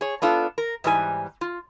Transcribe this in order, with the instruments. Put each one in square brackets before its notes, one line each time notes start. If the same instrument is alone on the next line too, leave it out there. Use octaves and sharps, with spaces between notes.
[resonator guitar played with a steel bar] G#4 C#5
B3 D4 F4 A4
A#4
G#2 E3 G3 A4 G#5
F4